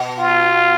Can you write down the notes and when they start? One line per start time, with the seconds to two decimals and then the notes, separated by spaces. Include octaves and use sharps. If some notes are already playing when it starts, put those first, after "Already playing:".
Already playing: B2
0.19 F4